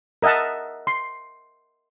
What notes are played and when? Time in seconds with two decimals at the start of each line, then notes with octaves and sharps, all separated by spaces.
0.22 A#4 D#5 E5 F#5 A5
0.87 C6